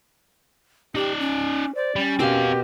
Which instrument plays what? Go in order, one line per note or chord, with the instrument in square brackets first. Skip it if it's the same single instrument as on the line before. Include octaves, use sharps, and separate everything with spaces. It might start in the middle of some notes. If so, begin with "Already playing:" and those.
[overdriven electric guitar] D#4 D5 [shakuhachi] G4
[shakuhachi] C#4
[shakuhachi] C5 [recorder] D5
[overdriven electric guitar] G3 [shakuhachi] C#4
[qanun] B2 A#4 C6 [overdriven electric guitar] C4 F5 [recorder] G4